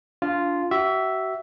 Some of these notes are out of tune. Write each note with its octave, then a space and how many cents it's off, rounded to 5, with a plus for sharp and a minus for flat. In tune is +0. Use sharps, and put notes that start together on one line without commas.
D4 -20 F4 -5
F#4 +40 E5 +0